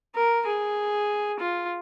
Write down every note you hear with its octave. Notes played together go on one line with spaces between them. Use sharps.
A#4
G#4
F4